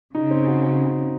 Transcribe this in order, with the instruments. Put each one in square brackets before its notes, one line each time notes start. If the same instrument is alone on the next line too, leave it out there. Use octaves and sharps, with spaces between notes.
[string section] C#3 [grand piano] D#4
[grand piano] C4
F#4